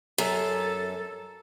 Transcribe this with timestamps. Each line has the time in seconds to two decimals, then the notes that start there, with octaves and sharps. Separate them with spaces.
0.18 F#2 A4